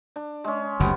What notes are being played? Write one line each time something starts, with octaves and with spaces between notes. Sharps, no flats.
D4
G#3 C#4
F#1 D2 C3 B3